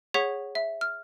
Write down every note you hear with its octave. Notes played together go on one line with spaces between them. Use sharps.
G#4 C#5 F#5 C#6 G#6 B6
E5
F6